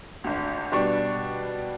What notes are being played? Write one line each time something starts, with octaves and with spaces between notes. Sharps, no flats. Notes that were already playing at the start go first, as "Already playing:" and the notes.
G#1 D2
B2 G3 D4 C#6